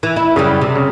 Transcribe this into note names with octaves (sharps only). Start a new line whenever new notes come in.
E3
E4
F#2 C#3 E3 G3
C3
C#3